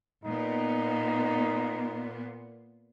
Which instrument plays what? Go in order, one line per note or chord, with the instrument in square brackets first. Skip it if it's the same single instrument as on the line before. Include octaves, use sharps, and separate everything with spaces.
[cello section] A#2 B3 [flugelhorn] D#4